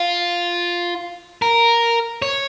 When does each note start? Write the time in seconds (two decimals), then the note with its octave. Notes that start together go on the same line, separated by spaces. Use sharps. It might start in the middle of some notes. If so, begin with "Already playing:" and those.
Already playing: F4
1.42 A#4
2.22 C#5